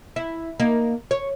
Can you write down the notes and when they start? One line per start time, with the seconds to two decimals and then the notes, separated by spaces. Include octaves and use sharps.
0.16 E4
0.60 A#3 D#4
1.11 C#5